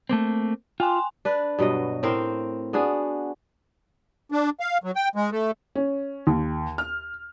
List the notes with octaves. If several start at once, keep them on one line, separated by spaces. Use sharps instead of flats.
A3 A#3 C4
F4 G5 G#5 C6
D4 B4
G2 B2 F#3 D#5
A2 C4 A#4 C5
B3 D4 F#4 G#4
D4
F5
F#3
G5
G#3
A3
C#4
D#2
F6